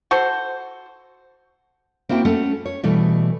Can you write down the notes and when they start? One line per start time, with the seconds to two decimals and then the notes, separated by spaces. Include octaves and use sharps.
0.11 F#4 A4 C5
2.09 A#3 C4 E4 F#4 G5
2.25 A3 C#4 A4 F#5
2.66 C#5
2.83 B2 E3 G3 A3